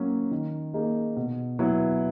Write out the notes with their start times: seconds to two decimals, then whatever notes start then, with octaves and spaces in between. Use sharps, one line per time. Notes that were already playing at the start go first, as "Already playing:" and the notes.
Already playing: F#3 A#3 C#4
0.31 D#3
0.74 A#3 D#4 G#4
1.16 B2
1.59 F#3 B3 E4